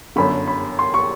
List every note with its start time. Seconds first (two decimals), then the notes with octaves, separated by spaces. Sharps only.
0.16 G1 F#2 D3 B5
0.47 B5
0.79 C6
0.94 C#6